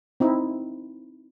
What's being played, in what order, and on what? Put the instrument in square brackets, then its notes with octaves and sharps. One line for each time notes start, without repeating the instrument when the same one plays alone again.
[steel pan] C4 D#4 E4